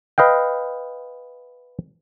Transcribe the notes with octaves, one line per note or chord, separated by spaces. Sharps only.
B4 D#5 F5 G5